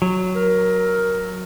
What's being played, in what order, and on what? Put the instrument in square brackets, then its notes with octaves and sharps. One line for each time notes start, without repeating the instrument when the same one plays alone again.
[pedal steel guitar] F#3
[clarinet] A#4